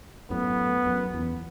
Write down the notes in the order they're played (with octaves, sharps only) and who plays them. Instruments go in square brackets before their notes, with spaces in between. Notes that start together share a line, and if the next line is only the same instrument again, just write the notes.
[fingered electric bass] F#2 A2 [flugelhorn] B3
[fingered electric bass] F#2
E2